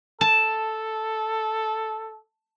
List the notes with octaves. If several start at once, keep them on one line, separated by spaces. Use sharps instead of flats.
A4 A5